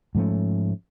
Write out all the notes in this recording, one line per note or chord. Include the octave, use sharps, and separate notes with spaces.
G#2 F3 A3 C#4